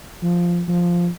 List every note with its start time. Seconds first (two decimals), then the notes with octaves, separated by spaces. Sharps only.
0.23 F3
0.68 F3